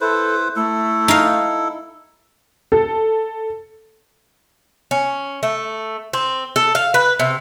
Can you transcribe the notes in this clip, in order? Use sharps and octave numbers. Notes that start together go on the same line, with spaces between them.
E4 A4 B4 C5
A3 E4 A4
D#4 F5
A4
C#4
A3
C4
A4
F5
B4
C3